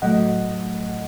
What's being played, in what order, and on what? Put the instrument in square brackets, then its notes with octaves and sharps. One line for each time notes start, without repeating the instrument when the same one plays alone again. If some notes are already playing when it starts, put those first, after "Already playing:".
[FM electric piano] A2 F#3 A3 D#5 F#5